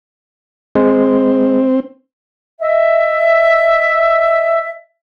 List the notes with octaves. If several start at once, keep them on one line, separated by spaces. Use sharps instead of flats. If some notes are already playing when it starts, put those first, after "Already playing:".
G#3 C4
D#5 E5